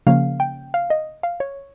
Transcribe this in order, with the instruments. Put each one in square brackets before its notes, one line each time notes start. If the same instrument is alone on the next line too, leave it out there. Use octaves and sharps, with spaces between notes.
[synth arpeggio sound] C#3 F3 A#3 C#4 F5
G5
F5
D#5
F5
C#5